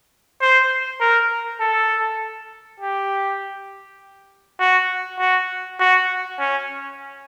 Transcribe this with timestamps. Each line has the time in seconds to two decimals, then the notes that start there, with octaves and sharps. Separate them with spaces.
0.42 C5
1.01 A#4
1.61 A4
2.80 G4
4.60 F#4
5.20 F#4
5.80 F#4
6.39 C#4